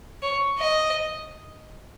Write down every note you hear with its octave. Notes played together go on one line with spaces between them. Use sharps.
C#5
D#5